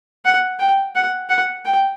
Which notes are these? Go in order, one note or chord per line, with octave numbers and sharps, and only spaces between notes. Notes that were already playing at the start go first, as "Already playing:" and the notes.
F#5
G5
F#5
F#5
G5